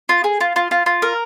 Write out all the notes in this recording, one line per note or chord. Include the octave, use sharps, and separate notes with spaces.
F4
G#4
F4
F4
F4
F4
A#4